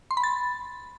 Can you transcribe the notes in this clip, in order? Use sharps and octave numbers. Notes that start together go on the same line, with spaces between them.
C6
B5
A6